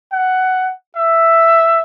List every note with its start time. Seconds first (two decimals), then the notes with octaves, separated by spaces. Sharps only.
0.12 F#5
0.96 E5